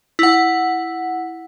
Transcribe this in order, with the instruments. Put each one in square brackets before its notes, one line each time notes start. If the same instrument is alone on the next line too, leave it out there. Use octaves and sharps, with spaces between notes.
[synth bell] E4 F#5